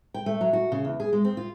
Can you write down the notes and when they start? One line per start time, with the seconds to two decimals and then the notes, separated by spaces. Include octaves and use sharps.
0.14 G5
0.26 A3
0.41 F#3
0.53 F#4
0.72 C#3
0.85 E2
1.00 G#4
1.13 G#3
1.25 C4
1.37 F4